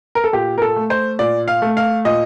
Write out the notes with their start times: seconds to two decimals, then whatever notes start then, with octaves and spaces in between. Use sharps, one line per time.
0.15 A#4
0.24 A4
0.33 A#2 G4
0.58 A#4
0.62 A4
0.76 A3
0.90 C5
1.19 A#2 D5
1.48 F5
1.62 A3
1.77 F5
2.05 A#2 D#5